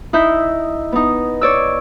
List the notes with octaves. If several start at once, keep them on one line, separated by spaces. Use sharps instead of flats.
D#4 E4 E5 G6
B3 D#4
C#5 D5 E6